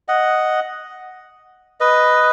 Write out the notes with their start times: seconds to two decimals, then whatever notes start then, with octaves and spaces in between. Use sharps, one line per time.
0.08 D#5 F#5
1.80 B4 D#5